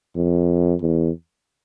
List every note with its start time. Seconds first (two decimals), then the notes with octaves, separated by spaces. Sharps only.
0.16 F2
0.81 E2